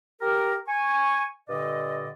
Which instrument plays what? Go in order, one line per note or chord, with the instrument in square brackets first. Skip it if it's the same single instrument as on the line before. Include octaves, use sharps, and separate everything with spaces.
[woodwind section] G4 A#4
G#5 C#6
G2 A#2 D3 D5 D#5